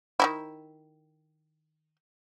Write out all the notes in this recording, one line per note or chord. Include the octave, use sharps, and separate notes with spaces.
D#3 E3 E4